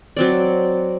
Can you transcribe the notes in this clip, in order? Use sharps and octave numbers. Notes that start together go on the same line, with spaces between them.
F#3 C4 D5